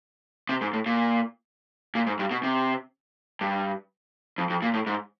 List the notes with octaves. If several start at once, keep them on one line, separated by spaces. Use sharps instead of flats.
C3
G#2
A2
A#2
A#2
G#2
G2
B2
C3
G2
F2
F2
A#2
A2
G#2